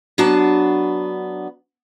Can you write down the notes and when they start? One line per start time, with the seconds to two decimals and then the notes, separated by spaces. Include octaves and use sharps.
0.18 F#3 B3 D4 A5